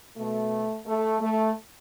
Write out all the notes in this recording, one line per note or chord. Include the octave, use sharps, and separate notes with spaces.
B2 A3
A3
A3